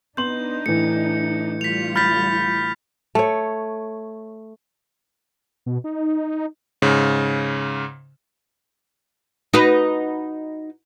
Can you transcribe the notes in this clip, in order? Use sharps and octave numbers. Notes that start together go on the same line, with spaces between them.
B3 D4 D#4 C6 G6 F#7
A2 E3 C#7
D3 G3 F4 B6 F7
B5 F6 G6 A6 B6
A3 C#5
B2
D#4
G#2 C#3
D#4 F#4 B4